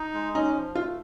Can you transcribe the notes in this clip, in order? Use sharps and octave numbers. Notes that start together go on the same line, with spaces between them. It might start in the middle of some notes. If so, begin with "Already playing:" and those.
Already playing: D#4
G#3
C#4 D#4
F3
A3 F4